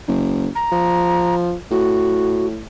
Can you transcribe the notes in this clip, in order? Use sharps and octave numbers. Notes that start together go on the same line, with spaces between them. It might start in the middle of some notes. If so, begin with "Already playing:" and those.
F#1
A#5
F3
A2 F#4